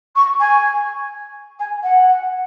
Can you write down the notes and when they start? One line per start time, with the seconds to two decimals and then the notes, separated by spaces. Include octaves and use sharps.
0.15 C#6
0.39 G#5
1.59 G#5
1.83 F#5